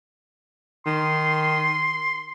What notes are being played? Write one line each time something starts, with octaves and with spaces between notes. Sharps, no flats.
D#3 C6